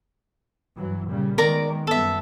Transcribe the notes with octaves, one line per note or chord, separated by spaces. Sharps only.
G2 E3 F#3
A#2 C#3 G3
D#3 G#3 B3 A#4 D5 A#5
F#1 G3 B3 A4 E5